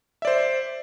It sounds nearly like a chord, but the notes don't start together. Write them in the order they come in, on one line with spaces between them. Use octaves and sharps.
E5 D5 C5